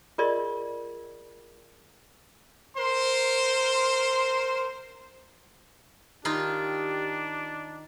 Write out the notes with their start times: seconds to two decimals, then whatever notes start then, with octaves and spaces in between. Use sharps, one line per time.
0.18 F4 G#4 A#4 D5 D#5 C6
2.77 A#4 C5 C6
6.25 D#3 D4 D#4 F4 G4